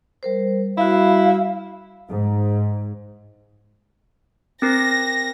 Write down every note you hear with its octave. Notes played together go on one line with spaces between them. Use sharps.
G3 A#4 C5
G3 E4 F#4 F5
G#2
C4 A#4 A#6